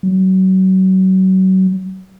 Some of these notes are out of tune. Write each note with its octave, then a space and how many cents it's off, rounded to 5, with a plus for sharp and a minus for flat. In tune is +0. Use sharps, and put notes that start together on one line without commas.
F#3 +30